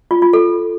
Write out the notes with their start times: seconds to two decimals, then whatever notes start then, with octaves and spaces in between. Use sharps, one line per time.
0.11 F4
0.22 F4
0.33 A4